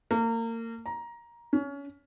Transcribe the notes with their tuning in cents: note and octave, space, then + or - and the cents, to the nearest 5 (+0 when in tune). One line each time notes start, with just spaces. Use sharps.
A#3 -35
A#5 +15
C#4 +25